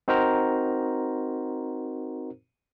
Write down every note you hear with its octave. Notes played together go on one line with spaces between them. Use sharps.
C4 D#4 F#4 A#4 C5 A#5